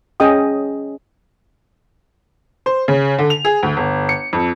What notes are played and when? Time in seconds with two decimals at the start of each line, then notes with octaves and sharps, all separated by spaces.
0.20 C#4 G#4 D#5 G5 D#6
2.66 C5
2.88 C#3
3.19 D3
3.30 F7
3.45 G#4
3.63 D2
3.77 G1
4.09 C#7
4.33 F2